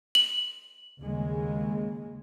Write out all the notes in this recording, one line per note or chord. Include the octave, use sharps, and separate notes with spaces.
F#7
D#2 C#3 G#3